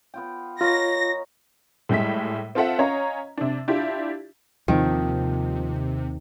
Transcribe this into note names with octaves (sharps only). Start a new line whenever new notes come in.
B3 F4 G5
F4 A#4 C#5 D#5 A#6
A2 G3 G#3 E5 B6
C4 F4 A4 E5 F#5
C#4 C#5 D#5 F5 A#5
C3 D4
D4 E4 F4 G4
D#2 C3 D#3 F3 G#3 C4 D#5